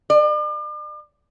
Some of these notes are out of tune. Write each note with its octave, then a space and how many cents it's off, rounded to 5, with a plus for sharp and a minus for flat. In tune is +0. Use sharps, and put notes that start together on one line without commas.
D5 +40